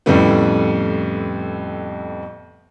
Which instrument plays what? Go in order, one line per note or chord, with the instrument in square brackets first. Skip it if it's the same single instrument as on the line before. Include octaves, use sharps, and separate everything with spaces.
[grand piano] F2 A2 C#3 G3 A3 B3